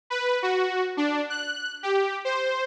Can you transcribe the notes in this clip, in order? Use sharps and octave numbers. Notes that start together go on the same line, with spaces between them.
B4
F#4
D4
F#6
G4
C5